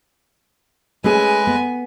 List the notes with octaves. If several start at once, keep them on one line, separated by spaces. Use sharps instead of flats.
G#3 A3 C#4 G#4 B4 G#5
B3